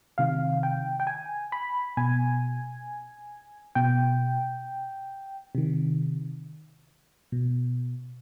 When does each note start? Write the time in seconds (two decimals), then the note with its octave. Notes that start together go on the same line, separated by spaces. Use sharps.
0.18 C3 D#3 F5
0.63 G5
1.00 G5
1.07 G#5
1.52 B5
1.97 B2 G#5
3.75 B2 G5
5.55 C3 D#3
7.32 B2